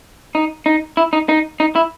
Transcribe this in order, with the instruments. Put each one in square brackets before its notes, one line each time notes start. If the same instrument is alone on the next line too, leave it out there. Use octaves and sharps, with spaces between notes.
[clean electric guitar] D#4
D#4
E4
D#4
D#4
D#4
E4